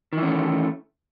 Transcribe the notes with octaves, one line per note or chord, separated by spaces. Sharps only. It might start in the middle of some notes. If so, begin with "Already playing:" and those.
D#3 E3 A3 C#4